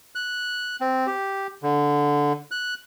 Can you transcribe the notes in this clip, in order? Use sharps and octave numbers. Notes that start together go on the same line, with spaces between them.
F#6
C4
G4
D3
F#6